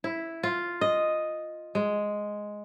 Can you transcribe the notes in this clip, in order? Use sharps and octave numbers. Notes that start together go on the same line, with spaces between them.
E4
F4
D#5
G#3